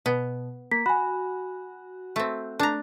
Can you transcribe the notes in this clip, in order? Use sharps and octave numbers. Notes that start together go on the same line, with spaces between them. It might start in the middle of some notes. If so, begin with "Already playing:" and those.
B2 B3
A#3 B6
F#4 G#5 B5
A3 C4
A3 D4 A#5